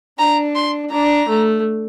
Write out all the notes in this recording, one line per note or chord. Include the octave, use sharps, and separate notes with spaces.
D4 A#5
C6
D4 A#5
A3